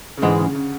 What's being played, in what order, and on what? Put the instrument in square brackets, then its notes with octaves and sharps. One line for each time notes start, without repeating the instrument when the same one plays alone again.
[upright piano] C#3
[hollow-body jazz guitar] G#2 E3 G#3 [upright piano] D3
[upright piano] C#3
C#3